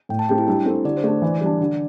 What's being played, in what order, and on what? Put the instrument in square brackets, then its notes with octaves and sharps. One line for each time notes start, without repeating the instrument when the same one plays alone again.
[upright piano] A2 [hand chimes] G5
[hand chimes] A5
[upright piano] A3 C4 G4 [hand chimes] G5
[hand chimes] E4
[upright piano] G3 [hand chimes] D4
[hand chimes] E4
[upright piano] C4 A4 [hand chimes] G4
[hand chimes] G4
[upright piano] D3 [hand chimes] D5
[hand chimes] C5
[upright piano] A3 D4 [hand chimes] D5
[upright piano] E3
G3 D4
D3